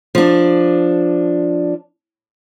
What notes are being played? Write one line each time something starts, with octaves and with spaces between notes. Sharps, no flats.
F3 D4